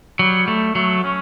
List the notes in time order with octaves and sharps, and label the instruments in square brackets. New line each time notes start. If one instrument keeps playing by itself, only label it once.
[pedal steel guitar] F#3 [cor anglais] G3
[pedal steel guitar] A3
[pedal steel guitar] F#3 [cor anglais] A3
[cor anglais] C#4